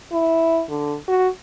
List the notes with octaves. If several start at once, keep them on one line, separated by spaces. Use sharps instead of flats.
E4
D3
F#4